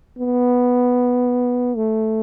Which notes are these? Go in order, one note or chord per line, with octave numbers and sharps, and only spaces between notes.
B3
A3